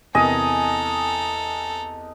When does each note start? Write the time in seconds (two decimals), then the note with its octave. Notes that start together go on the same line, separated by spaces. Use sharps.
0.15 E2 C3 A4 D#5 G#5 A#5 D#7